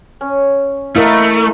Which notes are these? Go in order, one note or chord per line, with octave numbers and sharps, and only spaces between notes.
C#4
A3 E4 A#4 D#5 F5